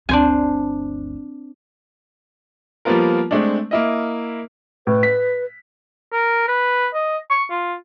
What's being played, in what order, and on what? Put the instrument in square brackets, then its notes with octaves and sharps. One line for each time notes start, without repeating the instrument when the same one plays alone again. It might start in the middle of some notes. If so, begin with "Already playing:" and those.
[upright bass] G1 D2 [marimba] C4 [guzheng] D4 C5 G#5
[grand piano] F3 G3 A#3 B3 F4 A#4
G#3 A3 C4 D4
A#3 E4 D#5
[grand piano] A2 [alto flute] B4
[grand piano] B6
[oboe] A#4
B4
D#5
C#6
F4